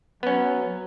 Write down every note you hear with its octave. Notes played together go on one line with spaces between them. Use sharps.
F#3 B3 C#4